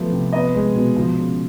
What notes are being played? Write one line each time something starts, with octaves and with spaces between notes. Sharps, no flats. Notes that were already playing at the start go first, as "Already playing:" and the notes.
Already playing: F3 A3 B3
C3
B3 D#5
G#3
B2
F3
C#3